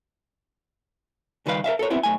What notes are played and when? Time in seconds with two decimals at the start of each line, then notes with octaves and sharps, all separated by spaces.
1.46 C#2 D#3 G3 B4 F5
1.64 A#4 C#5 E5 F5
1.79 A4 A#4 C#5
1.90 B3 C4 E4 G4 E5
2.03 B1 A3 G#5